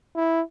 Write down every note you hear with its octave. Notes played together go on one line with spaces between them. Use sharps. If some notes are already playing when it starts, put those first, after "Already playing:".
E4